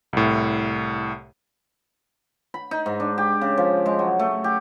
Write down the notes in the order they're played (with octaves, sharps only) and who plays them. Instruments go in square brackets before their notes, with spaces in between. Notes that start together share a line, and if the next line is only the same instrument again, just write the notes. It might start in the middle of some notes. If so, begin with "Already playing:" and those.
[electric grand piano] C2 A2
[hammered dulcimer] B5
D#4
G#2
D4
G4
C#3
F3
G#3
F#3
A3
G4